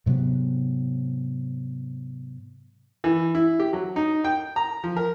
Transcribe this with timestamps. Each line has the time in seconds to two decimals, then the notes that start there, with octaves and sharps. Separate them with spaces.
0.06 G#2 C3 F#3 B3
3.04 E3
3.35 E4
3.59 G4
3.73 F#3
3.96 D#4
4.24 G5
4.56 A#5
4.84 F3
4.96 A#4